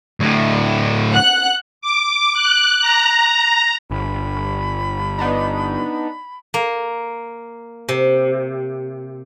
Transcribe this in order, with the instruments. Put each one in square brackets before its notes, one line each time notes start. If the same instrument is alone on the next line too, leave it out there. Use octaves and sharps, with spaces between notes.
[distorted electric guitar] D2 A2
[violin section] F#5 F#6
[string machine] D6
F#6
A#5
[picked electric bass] G1 [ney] B5
[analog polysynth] B3 D4 D#4
[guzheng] A#3
C3